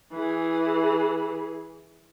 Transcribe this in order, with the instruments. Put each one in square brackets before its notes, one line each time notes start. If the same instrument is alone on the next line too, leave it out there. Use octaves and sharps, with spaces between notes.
[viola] E3 G#4